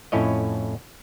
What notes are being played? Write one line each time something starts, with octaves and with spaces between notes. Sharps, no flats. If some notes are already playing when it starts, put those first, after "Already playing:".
F2 A2 C#4 E4 C#5 D#5